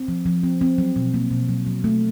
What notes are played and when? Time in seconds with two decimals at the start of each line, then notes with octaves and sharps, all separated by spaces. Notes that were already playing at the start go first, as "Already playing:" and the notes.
Already playing: C4
0.08 F3
0.26 F3
0.44 C4
0.61 C4
0.78 F#3
0.96 B2
1.14 A#3
1.31 B2
1.49 F#3
1.67 F#3
1.84 A3